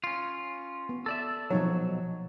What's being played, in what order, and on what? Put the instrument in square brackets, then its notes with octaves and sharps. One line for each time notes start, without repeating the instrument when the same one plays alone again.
[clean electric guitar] C#4 F4
[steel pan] B3
[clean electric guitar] A4 D5 E5
[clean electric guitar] B1 F#3 [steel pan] F3 D#4 C#5